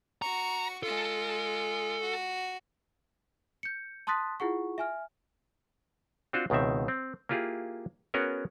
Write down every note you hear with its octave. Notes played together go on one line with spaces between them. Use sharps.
F#4 A#5 C#6
G#3 F4 A4
F#4
G6 C#7
A5 C6 D#6 F#6 A6 B6
E4 F4 G#4 F#5 C#6
E5 G#5 F6
C4 D4 F4 F#4 C5
C#2 B2 D#3 C4 E5
C4
A#3 E4 F4 G4 G#4
B3 C#4 F#4 G#4 A#4